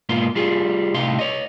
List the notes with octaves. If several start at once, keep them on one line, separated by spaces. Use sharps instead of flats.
G#2 B2 A#3 B3 F4 C6
G3 F4 G#4
C2 A2 C3 D#4 F5 C6
C#5 D#5